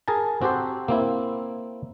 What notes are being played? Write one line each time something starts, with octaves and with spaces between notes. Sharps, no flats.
G#4 A#4 G#5 A5
C4 F#4 G4 A4 C5
A#3 C4 E4